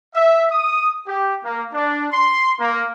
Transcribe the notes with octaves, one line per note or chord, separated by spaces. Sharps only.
E5
D#6
G4
A#3
D4
C6
A#3